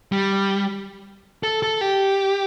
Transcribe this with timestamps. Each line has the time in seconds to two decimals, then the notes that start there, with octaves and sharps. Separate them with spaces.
0.12 G3
1.43 A4
1.63 A4
1.81 G4